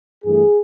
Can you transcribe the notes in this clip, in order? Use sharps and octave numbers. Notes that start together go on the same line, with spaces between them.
G2 E3 A3 G#4